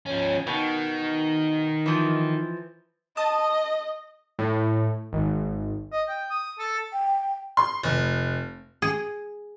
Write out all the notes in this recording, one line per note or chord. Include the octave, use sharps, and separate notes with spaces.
F3 C#4
B2 D#3
E3 F3
D#5 A5 D#6
A2
G#1
D#5
G5
D#6
A4
G5
C6
F1
G#4